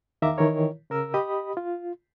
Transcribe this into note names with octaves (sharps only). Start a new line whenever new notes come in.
E2 D#3 E5 F5 A#5 D6
D#3 E3 E4 A#4 C#5
C#3 A#4 E6
G4 D#5 B5 D#6
F4